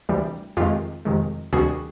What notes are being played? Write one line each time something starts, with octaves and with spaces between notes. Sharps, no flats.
D2 C3 E3 G3
F2 C3 D#3 G#3 F4 G4
F2 C3 D#3 G#3
D2 C3 D#3 G3 F#4 G#4